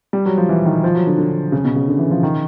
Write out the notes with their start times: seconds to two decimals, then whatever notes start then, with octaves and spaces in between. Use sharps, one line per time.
0.13 G3
0.26 F#3
0.37 F3
0.49 E3
0.65 D#3
0.84 F3
0.95 F#3
1.07 D3
1.18 D3
1.52 C#3
1.64 B2
1.76 C#3
1.88 D3
1.99 E3
2.11 F3
2.23 D#3